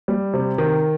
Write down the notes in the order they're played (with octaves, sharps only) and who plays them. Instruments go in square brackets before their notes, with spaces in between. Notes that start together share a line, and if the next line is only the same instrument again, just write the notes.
[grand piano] G3
C3
D#3